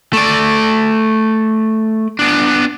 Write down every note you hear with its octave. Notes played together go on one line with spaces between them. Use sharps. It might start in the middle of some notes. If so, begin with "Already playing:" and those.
A3 D5
B3 D4